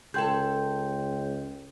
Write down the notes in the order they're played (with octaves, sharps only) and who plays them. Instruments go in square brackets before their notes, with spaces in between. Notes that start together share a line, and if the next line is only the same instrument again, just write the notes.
[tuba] C#2 [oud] G#4 A4 [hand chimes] G5 C6 G6